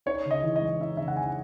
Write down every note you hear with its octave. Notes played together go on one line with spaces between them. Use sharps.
D#4 C#5
C#3
D#5
E3
D#5
G#3
D#4 E5
C#3 E5
F#5
E3 G#5